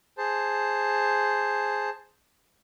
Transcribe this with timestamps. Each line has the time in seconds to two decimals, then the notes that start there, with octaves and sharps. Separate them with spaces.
0.18 G#4 C5 A5